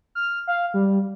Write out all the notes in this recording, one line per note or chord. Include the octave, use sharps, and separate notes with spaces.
F6
F5
G3